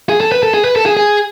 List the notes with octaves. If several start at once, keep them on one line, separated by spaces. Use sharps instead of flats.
G#4
A4
B4
A4
G#4
B4
A4
G#4
G#4